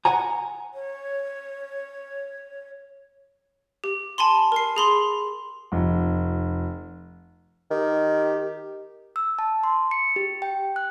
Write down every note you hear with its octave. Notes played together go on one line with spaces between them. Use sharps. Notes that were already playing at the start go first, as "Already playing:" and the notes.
F#5 G#5 A#5
C#5
G4
G#5 A5 B5 C6
A#4 C7
G#4 B5 C6
F1
D#3 G4
E6
A5
C6
C#7
G4
G5
F#6